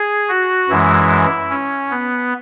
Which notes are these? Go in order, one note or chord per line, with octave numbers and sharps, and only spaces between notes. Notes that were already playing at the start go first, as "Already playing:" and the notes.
Already playing: G#4
F#4
F#2 E3 G#3 E4
C#4
B3